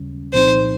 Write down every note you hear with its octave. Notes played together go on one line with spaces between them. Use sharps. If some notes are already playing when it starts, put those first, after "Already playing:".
Already playing: D#2 C#3 G3 C#4
C2 A#2 F3 C4 D#4 C5